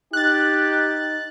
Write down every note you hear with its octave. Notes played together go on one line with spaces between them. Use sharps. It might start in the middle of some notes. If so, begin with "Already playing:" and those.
D#4 G4 F#6 A6